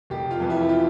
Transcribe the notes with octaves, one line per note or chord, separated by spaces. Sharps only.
F1 G4
F4
F2 E3
E4
G4
F4